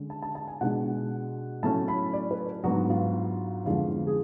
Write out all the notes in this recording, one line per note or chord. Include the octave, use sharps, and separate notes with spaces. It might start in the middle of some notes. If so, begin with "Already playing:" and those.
Already playing: D3 G#3 C#4
A5
A5
A5
G#5
B2 G#3 D4 F#5
A2 F#3 A3 C#4 A5
B5
D5
B4
G#2 F#3 B3 D4 F#4
F4
F2 D3 G#3 B3 D4 F4
F4
G#4